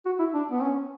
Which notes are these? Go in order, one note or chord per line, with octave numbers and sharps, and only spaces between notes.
F#4
E4
D4
B3
C#4